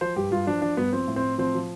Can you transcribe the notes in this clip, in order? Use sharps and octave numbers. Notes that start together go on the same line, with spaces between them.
F3 C5
G2 G4
G2 F4
F3 D4
F3 D4
G2 B3
F3 C4
A2
C4
A2
F3 C4
F3